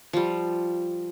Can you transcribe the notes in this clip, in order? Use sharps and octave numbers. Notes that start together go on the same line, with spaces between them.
F3 G3